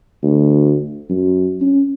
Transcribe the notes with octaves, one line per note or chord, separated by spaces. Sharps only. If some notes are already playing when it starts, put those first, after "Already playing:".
D2
F#2
C#4